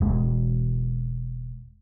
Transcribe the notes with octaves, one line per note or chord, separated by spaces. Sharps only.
E1 G#3